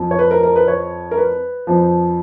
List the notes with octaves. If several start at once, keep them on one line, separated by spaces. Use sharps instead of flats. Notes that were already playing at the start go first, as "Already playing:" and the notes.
Already playing: F2 F3
C#5
B4
A#4
A#4
B4
C#5
A#4
B4
F2 F3